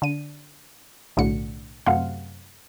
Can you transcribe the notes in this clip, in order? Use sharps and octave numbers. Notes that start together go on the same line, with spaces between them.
D3 D#7
B1 A2 D3 F#4 C#7
F#2 C3 A3 C4 F5 F#5